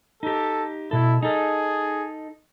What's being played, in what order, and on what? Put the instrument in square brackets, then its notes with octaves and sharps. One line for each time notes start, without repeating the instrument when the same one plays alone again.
[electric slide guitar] D#4 G4 [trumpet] A4
[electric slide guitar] B2 A4 [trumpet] E4
[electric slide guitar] D#4 A4 [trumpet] G#4